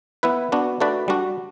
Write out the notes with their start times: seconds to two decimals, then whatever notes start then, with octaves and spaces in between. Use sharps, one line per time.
0.23 B3 E4 B4
0.52 B3 D4 F#4
0.80 A3 D4 F#4 B4 D5
1.08 G3 D4 F#4